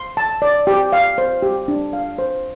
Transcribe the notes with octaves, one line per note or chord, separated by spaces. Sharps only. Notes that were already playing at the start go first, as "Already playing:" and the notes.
Already playing: C6
A5
D5
G4
F5
C5
G4
D4
F5
C5